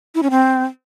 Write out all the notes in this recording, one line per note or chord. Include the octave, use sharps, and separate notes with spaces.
E4
C#4
C4